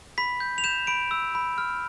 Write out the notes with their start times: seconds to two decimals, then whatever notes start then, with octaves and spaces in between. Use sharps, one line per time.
0.18 B5 B6
0.40 G6
0.58 F7
0.64 G6 E7
0.87 B5 D7
1.11 E6
1.35 B5
1.58 F6